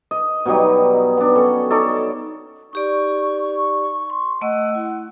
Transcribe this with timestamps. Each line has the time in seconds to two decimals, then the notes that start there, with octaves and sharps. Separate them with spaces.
0.11 D#5
0.45 B2 F#3 G3 D#4
1.17 B3 D4
1.35 C#4 A4
1.70 D#4 A4 C#5 D5
2.73 D#4 G4 D5 C#6
4.10 C6
4.41 A3 D#5 F#5 E6
4.75 E4 F#5